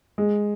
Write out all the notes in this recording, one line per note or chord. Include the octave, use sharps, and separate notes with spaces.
G#3